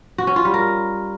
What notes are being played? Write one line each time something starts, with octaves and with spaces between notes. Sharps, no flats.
F#4
C#4
F4
G3
A#4